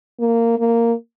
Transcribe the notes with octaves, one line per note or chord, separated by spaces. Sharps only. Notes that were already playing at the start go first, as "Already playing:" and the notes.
A#3
A#3